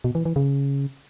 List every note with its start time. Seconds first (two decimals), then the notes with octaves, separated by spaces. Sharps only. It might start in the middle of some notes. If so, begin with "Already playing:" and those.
0.04 B2
0.15 E3
0.25 E3
0.36 C#3